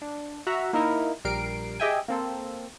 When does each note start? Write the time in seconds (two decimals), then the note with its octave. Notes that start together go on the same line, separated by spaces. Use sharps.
0.02 D4
0.47 F#4 E5 F#5 A#5
0.73 A#3 D#4 E4 A#4
1.25 A#1 G3 A#4 C7 D7
1.80 G4 G#4 D#5 E5 G5 G#5
2.08 A#3 C4 A4